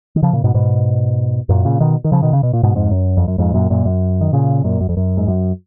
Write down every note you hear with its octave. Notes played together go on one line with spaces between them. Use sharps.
D#3
C#3 F3
A#2 C#3
G#2 B2
G#2 B2
F#2 A#2
A#2 C#3
B2 D#3
D#3
C#3 F3
B2 D#3
C#3
B2
A#2
G#2 B2
F2 G#2
F#2
F2
F#2
F2 G#2
F#2 A#2
F#2 A#2
F#2
D#3
A#2 C#3
F#2 A#2
F#2
F2
F#2
G#2
F#2